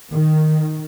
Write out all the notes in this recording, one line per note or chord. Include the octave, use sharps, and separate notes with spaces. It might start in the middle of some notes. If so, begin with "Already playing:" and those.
D#3